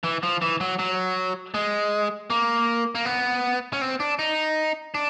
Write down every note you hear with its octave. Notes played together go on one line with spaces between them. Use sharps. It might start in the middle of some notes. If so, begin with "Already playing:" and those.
E3
F3
E3
F#3
F#3
G#3
A#3
A#3
B3
C#4
C4
D4
D#4
D4